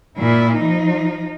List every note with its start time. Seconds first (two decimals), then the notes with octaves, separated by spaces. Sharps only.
0.18 A#2 E4
0.56 F3 D#4